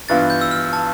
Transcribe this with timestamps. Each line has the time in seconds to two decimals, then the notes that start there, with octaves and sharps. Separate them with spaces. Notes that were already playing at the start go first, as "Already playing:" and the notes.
0.09 G2 E3 B3 F4 A6
0.30 G6
0.41 E6
0.51 F6
0.73 A5